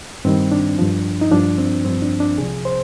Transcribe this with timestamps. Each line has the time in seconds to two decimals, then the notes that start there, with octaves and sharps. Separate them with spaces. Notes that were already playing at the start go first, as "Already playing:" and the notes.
0.25 G2 D#3 G3 C4
0.52 D4
0.79 G2 F3
1.21 D#4
1.31 G2 F3 D4
1.58 C4
1.84 G2 F3 C4
2.02 D4
2.20 D4
2.38 C2 C3 F3 G#4
2.65 C5